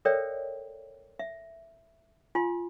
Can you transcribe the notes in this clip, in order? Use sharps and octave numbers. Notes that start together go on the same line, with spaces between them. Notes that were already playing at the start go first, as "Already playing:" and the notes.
A4 A#4 C#5 D5 E5 G5
E5
F4 G#5 C6